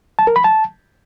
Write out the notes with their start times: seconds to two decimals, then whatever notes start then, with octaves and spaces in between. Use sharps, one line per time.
0.19 A5
0.27 A#4
0.36 B5
0.44 A5